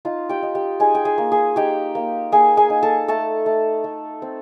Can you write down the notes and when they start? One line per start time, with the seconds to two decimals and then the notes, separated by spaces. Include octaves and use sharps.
0.05 D#4 F4 F5
0.29 G4 G5
0.43 D#4
0.55 G4 G5
0.80 D#4 G#4 G#5
0.95 G5
1.05 G#4 G#5
1.18 A#3
1.32 G#4 G#5
1.56 D#4 G4 G5
1.95 A#3
2.32 A#3 G#4 G#5
2.57 G#4 G#5
2.70 D#4
2.83 A4 A5
3.08 A3 A4 A5
3.46 A3
3.84 A3
4.22 C4